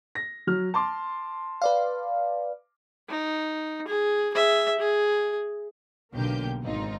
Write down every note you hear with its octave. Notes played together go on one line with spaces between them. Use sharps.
A#6
F#3 F6
A5 C6 D6
B4 D5 F5
D#4
G#4
G#4 E5
G#4
B1 D3 A#3 G4 G6
G#1 C4 D#4 F4